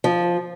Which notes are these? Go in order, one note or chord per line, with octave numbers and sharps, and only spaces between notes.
F3